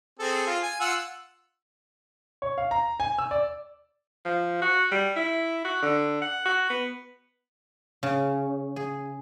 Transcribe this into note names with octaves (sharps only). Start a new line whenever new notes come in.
C4 G#4 A4
F4
G#5
F4 F#5 E6
C#5
F5
A#5
G#5
E6
D5
F3
F#4
G3
E4
F#4
D3
F#5
F#4
B3
C#3
G#4